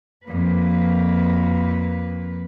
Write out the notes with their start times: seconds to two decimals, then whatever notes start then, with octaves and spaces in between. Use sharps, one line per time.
0.24 F2 A#3 B4